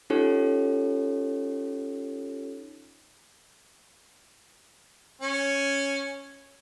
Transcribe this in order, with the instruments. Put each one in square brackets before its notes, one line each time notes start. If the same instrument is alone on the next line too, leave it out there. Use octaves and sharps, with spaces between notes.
[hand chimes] C#4 D#4 F4 G4 A4 C#5
[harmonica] C#4